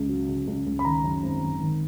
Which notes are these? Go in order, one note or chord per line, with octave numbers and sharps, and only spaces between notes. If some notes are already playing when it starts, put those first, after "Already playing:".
Already playing: C#2
F#3
C#3
C#2
C#2
B5
D#3 A#5
F#2
G#1
G#1
D#3